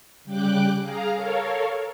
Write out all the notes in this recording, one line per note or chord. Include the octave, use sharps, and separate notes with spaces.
C#3 G3 G5 D6 F#6
G#4 F5 A#5
A4 A#4 C#5 F5